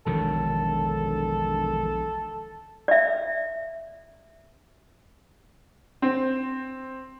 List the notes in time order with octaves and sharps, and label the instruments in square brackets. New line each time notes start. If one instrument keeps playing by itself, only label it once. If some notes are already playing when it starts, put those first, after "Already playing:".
[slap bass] E1 D#3 F#3 [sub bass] A#1 [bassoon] A4
[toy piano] D5 E5
[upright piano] C4